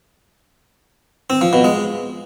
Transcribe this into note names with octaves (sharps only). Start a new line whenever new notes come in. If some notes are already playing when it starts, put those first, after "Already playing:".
C4
F3
B2
G#3